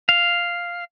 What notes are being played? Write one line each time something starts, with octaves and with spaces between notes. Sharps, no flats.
F5